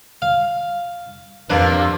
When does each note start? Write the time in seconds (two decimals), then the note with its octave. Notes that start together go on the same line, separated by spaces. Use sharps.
0.22 F5
1.50 F2 C3 A#3 D4 B4